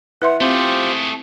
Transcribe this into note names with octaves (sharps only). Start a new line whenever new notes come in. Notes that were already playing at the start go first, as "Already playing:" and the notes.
E4 B4 E5 F#5 C6
A3 C4 F4 G4 G#4 C5